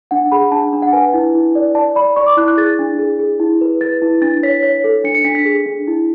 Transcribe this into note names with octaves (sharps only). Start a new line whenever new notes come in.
D4 F#5
G#4 B5
D4 A5
D4
F#5
B4 G#5
E4
E4
D5
D5 A5
D5 B5
D5 C#6
D6
E4 F#6
F#6
G#4 A6
D4
G#4
G#4
E4
B4
B4 A6
E4
D4 A6
C#5 B6
C#5 B6
A4
D4 C#7
C#7
D4 B6
B6
G#4
D4
E4